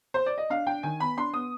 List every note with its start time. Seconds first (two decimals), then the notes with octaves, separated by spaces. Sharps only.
0.14 C5
0.26 D5
0.38 D#5
0.50 D4 F5
0.67 D4 G5
0.83 D#3 G#5
1.00 B3 B5
1.17 D4 C6
1.33 B3 D#6